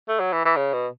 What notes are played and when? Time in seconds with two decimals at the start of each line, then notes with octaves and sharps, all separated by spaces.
0.08 A3
0.20 F#3
0.33 E3
0.45 E3
0.57 C#3
0.73 B2